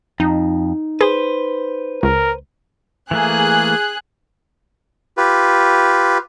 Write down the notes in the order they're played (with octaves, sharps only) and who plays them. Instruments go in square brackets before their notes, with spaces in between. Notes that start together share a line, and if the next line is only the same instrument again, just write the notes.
[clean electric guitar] F2 [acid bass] D#4
[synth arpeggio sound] G#4 [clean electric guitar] B4 C5
[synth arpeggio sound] C#2 [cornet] A#4
[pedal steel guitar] E3 A3 A#3 [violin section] G#4 F#6
[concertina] F4 G4 B4